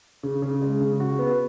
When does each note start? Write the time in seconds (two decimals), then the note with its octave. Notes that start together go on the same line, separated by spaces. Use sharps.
0.23 C#3
0.42 C#3
0.62 G#3
0.81 C#3
1.00 F#4
1.19 B3